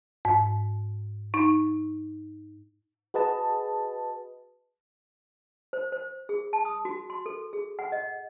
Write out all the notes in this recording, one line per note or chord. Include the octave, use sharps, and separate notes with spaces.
G#2
D#4
F#4 G#4 B4 D#5 A5
C5
C5
G#4
A5
D#6
F#4
C6
A4
G#4
F#5
D#5